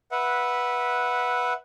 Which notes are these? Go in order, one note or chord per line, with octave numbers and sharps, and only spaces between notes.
B4 E5 F#5